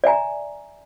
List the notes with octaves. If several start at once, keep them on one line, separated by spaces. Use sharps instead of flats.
D5 E5 G#5 A#5